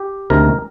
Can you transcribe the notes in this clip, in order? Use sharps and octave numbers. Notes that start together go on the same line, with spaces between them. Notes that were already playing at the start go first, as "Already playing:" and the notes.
Already playing: G4
D2 C3 D#3 A#4